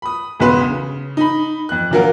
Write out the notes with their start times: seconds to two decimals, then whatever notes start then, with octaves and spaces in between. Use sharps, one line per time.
0.02 B5 D#6
0.40 E1 B1 C#3 F#4 B4 C6
0.70 C#3
1.17 D#4 B5
1.69 F2 F#6
1.91 A#2 D3 F#3 A#3 A#4 F#5